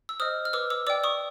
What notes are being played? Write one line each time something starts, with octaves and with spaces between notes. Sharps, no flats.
E6
C5 D#5 D#6 F6
F6
B4 D6 E6
D6 E6
D5 G5 D6 E6
C#6 D#6